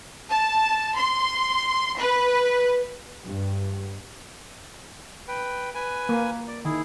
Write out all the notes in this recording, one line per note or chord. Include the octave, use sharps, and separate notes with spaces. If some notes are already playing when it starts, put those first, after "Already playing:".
A5
C6
B4
G2
B4 G5
B4 G#5
A#3
D5
D#3 E4 G#4